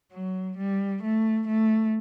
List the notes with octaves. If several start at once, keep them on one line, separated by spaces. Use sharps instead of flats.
F#3
G3
A3
A3